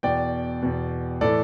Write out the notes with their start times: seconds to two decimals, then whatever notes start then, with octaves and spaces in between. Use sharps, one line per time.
0.03 E2 B2 D5 G5
0.62 E2 B2
1.21 A2 E3 A4 D5